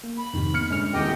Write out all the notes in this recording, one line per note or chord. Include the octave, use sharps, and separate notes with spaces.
A#3
B5
F2 G#2 C3 D#3
A#3 B3 F6 C#7
G1 G#3 C#4 F6
D#1 E2 G4 D#5 G5